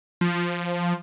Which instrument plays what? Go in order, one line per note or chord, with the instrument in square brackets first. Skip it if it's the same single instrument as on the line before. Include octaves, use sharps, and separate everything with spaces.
[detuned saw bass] F3